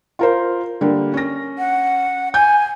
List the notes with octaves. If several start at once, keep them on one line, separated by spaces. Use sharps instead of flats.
F4 A#4 C5
D3 G3 A#3
C#4 A#6
F#5
G#5 G6